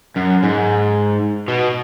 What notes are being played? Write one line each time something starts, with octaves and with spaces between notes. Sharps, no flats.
F#2
G#2
B2